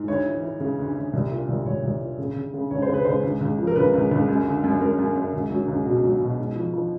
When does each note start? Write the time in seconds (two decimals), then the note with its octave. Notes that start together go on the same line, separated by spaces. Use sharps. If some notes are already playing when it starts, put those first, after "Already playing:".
Already playing: G#2
0.08 D2 C#5
0.26 E3
0.43 E3
0.60 C#3
0.79 D2
0.95 D2
1.13 C2
1.31 A#2
1.48 C2
1.66 C2 C#5
1.83 C2
2.00 A#2
2.18 C#3
2.36 C#3
2.54 C#3
2.71 C#2 C#5
2.82 C5
2.89 C#3
2.94 B4
3.05 C#2 C5
3.23 C#2
3.41 C#2
3.58 F3
3.67 A#4
3.76 C#2 B4
3.94 C#2
4.11 C#2
4.28 F#2
4.46 D3
4.64 F#2
4.81 F#2 A#4
4.99 F#2
5.16 F#2
5.33 C#2
5.51 F#3
5.68 C#2
5.86 B2 F#4
6.04 F#3
6.21 B2
6.38 G#2
6.55 F3
6.74 F3